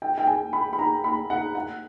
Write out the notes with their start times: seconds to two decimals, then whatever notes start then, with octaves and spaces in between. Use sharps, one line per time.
0.02 G5
0.18 G5
0.27 G#5
0.53 B5
0.73 B5
0.79 A#5
1.04 B5
1.30 F#5
1.55 F#5